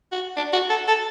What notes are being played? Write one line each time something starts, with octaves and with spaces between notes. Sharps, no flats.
F#4
D4
F#4
A4
A4